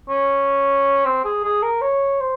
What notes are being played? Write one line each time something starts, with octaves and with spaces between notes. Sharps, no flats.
C#4
C4
G#4
G#4
A#4
C#5
C5